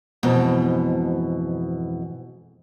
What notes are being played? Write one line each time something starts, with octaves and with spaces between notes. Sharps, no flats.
F2 G#2 B2 E3